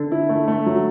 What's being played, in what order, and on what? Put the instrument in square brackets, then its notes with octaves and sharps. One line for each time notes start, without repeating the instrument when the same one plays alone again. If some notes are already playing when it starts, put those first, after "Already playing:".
Already playing: [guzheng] D3
[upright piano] E4
A3
A3
F#3